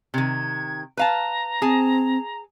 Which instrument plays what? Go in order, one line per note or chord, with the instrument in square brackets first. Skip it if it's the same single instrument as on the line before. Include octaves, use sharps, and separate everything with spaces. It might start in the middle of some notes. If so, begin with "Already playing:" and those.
[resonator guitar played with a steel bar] C3 D#3 [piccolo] G#6
[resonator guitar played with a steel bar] B4 F5 A5 [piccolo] A#5
[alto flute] C4 [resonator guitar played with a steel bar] G#4 A5